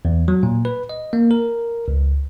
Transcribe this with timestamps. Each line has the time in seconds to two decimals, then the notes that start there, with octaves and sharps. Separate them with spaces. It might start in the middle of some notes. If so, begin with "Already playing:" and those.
0.05 E2
0.28 F#3
0.43 A#2
0.65 B4
0.89 D#5
1.13 A#3
1.31 A#4
1.88 C#2